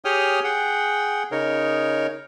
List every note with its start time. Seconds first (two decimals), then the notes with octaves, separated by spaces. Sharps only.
0.05 G4 G#4 C#5 G5 D#6 F6
0.44 G#4 F#5 G5
1.32 C#3 D#4 A#4 C#5